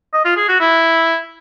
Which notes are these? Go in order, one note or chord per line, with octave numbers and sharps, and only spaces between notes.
D#5
F4
G#4
F#4
E4